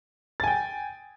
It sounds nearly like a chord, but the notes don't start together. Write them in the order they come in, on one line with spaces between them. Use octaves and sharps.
A6 G#5 G5